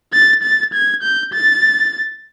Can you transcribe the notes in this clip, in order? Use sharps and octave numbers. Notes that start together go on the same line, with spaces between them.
A6
A6
G#6
G6
A6